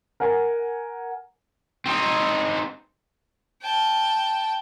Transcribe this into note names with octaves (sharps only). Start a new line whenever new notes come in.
A#4 F#5 G#5
C4 D#4
G5 A5